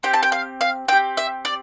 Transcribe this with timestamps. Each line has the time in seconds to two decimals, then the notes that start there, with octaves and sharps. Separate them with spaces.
0.03 C4 G4 G5
0.14 A5
0.23 G5
0.32 F5
0.61 F5
0.88 C4 G5
0.93 G4
1.17 E5
1.45 D5